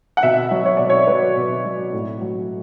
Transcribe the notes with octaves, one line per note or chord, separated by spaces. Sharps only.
F#5
B2 E5
F#3
C#5
B2 D5
C#5
F#3 B4
B2
F#3
A2
F#3